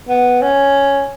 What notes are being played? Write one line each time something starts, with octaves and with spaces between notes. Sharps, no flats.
B3
C#4